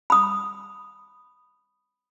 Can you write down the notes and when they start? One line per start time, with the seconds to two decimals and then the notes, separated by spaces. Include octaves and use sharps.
0.10 B5 D#6